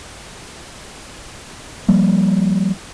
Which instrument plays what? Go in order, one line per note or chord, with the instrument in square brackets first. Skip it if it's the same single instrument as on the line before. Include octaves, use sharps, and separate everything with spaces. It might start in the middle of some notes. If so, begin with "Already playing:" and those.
[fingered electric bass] F3 G3 A#3